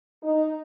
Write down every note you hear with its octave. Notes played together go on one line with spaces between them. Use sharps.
D#4